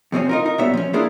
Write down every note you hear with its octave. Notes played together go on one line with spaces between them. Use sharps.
F2 C3 C4 C#4
D#4 F4 A#4
D#4 A#4
A#2 G3 B3 C#5 E5
F3 C#4
A#3 D4 E4 F4 G#4 A#4